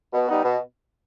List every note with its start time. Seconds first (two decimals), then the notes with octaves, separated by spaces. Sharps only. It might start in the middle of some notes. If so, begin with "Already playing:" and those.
0.13 B2
0.28 G3 B3 D#4
0.43 B2